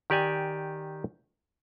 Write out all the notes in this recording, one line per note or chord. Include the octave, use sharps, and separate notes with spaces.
D#3 G4 D5 G#5